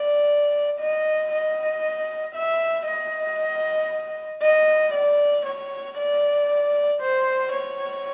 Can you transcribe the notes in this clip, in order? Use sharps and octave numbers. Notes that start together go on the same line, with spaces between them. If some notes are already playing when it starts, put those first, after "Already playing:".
Already playing: D5
D#5
D#5
E5
D#5
D#5
D5
C#5
D5
C5
C#5